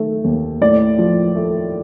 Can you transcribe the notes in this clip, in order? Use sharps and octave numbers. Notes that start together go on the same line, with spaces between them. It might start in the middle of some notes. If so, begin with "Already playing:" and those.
Already playing: D#3 A3
D#2
A2 D5
F3
A3